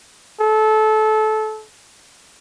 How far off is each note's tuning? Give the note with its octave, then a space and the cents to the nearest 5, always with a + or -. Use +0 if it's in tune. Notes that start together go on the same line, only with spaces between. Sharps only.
A4 -25